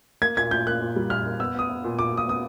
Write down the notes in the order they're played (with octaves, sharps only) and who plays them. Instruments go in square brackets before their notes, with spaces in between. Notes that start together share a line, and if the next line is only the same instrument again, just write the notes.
[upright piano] A#3 G#6
A#2 G#6
A#2 G6
A#3 F#6
A#2
G3
A#2 F6
A#3
B3 E6
B3 D#6
B3
A#2
A#2 D6
A#2 D#6
B3 D#6